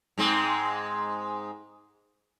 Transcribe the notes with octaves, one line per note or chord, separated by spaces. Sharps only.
G#2 G#3 C4